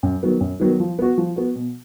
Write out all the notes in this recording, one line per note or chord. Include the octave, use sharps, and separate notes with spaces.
F#2
D#3 F#3 B3
F#2
D#3 F#3 B3
F3
B3 F#4
F3
B3 F#4
B2